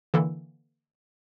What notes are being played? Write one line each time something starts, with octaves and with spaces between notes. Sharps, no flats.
D3 E3 A#3 A4